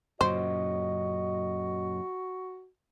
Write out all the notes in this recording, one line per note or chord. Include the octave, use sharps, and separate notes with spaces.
F#2 A#2 C#3 F#4 C5 D#5